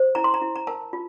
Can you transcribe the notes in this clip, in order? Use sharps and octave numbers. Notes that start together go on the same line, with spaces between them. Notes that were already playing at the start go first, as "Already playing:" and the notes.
Already playing: C5
E4 A#5
C6
A#5
E4
A#5
A#4 A5
F4